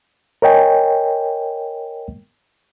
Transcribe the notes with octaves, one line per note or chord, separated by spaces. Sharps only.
A#4 C#5 D#5 G5 G#5